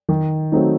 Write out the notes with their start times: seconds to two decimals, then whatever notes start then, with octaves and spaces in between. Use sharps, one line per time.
0.09 D#3
0.52 F#3 A3 C4 D#4